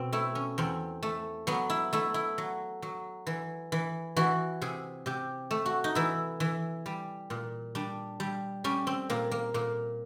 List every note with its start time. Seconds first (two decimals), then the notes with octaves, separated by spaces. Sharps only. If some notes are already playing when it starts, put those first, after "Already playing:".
Already playing: B2 C4
0.13 A3 E4
0.35 C#4
0.58 E2 C4
1.03 A3
1.47 F#3 B3
1.70 E4
1.93 A3 E4
2.14 E4
2.38 F#3
2.82 F#3
3.27 E3
3.72 E3
4.16 E3 F#4
4.61 C3 G#4
5.06 C3 G4
5.51 A3
5.66 F#4
5.84 D#4
5.95 E3 E4
6.40 E3
6.86 G3
7.30 A#2
7.75 G3 D4
8.20 G3
8.64 G3 C#4
8.87 C4
9.10 A#2 A#3
9.31 A#3
9.54 A#2 A#3